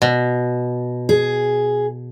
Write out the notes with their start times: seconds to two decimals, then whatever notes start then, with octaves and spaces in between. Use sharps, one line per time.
0.02 B2
1.09 G#4